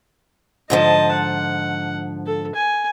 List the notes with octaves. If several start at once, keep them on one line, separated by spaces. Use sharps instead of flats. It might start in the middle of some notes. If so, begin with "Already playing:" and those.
G#2 D3 F3 D#5 A5
F#5
A4
G#5